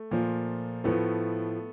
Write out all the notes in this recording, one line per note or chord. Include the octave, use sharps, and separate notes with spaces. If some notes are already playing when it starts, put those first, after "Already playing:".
Already playing: A3
A#2 F3
A2 F3 A3 B3